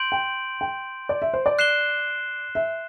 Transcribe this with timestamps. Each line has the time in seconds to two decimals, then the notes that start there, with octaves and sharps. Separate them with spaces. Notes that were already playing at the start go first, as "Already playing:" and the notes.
Already playing: C6 G6 D7 F#7
0.12 G5
0.61 G5
1.09 D5
1.22 E5
1.33 C5
1.46 D5
1.59 F#6 C7 E7 G7
2.55 E5